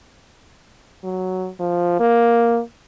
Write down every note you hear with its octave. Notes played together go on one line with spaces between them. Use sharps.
F#3
F3
A#3